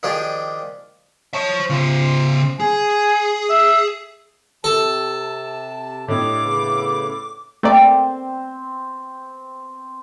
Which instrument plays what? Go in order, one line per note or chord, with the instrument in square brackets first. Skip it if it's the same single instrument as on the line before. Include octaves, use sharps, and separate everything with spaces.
[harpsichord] D#3 F3 D4 G4 G#4
[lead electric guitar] C5 A5 [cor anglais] C#5
[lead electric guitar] C#3 C5 [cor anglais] F4
[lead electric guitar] G#4 [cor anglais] G#5
[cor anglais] E5
[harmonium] C3 A5 [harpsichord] A4
[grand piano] A2 D4 [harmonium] G4 C#5 D#5 [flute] D6
[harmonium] C#3 B3
[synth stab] A3 A#3 D5 [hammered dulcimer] C4